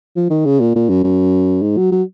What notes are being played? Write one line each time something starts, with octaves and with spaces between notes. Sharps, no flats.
F3
D#3
C#3
A#2
A#2
F#2
F#2
G#2
F#3
F#3